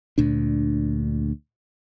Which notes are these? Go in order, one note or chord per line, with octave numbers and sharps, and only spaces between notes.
D2 A#2 D4